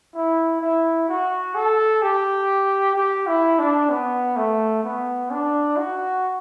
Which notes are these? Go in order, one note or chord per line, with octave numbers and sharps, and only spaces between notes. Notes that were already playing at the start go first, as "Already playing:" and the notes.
E4
E4
F#4
A4
G4
G4
E4
D4
B3
A3
B3
D4
F#4